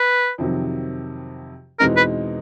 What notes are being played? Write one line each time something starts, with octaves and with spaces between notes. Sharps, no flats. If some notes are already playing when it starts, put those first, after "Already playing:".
Already playing: B4
F2 C3 D#3 F#3
E2 B2 G#3 C4 D#4 A#4
B4